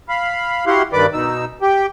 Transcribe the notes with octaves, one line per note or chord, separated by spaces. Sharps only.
F5 B5
E4 F#4 G4 F5 F#5 C6
G2 D#3 B4 D5 B5 D6
B2 D#4 E6
G4 G5